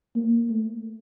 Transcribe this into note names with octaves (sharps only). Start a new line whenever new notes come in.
A#3
A3